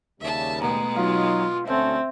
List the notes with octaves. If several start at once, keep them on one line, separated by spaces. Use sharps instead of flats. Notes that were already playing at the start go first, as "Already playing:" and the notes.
D#2 C#3 G3 E5 A5
B2 G#3 A3 B3 A#5
F#3 D#4 F4 F5
D2 C4 C#4 A4 E5